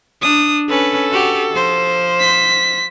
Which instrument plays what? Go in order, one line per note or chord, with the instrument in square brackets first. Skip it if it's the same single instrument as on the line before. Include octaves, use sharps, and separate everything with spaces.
[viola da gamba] D4 [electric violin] D#6
[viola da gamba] C#4 B4 [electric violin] A4
[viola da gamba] F#4 G4
F3 C5
[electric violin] B6